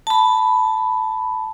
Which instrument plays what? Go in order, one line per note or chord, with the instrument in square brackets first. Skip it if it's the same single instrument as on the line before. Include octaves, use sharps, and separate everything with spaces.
[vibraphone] A5 B5